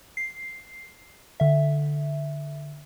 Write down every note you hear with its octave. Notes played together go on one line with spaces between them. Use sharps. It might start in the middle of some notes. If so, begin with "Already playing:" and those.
C7
D3 E5